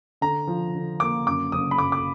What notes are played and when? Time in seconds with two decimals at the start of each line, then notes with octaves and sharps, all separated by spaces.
0.21 D3 A#5
0.47 F3
0.75 D3
1.00 A#3 D6
1.26 F#2 D6
1.52 F#1 D#6
1.71 B5
1.78 F#2 D6
1.92 D6